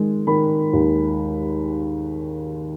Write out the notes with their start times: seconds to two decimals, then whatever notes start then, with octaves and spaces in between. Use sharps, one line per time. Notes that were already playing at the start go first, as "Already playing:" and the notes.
Already playing: D#3 G#3
0.27 D#3 B5
0.73 D#2